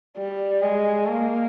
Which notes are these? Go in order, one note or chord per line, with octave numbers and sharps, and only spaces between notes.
G3
G#3
A#3